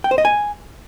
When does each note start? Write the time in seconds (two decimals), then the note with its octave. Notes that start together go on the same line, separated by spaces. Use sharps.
0.04 G5
0.11 C5
0.18 D#5
0.25 G#5